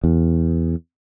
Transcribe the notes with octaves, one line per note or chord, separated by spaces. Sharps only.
E2